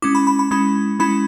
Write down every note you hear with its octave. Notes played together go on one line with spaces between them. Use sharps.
G#3 C#4 E4 D6
B5
B5
B5
G#3 C#4 E4 B5
G#3 C#4 E4 B5